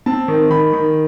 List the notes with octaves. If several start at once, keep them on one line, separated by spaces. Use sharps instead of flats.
C4 A5
D#3
D#3 B5
D#3